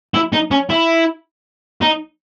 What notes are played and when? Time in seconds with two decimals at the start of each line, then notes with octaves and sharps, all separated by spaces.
0.14 E4
0.33 D#4
0.51 C#4
0.70 E4
1.81 D#4